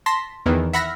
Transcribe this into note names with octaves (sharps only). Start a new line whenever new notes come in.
A5 C6 A#6 B6
E2 D#3 E3
E5 F#5 B5 F6 A#6 B6